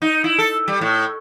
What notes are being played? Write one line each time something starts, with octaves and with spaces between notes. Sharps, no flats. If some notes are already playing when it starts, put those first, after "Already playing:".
D#4
E4
A4
G3
A2